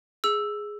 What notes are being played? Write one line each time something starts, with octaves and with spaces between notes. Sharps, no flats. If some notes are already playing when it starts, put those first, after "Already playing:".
G#4 E6